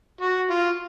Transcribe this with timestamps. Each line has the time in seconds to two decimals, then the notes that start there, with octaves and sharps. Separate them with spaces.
0.21 F#4
0.50 F4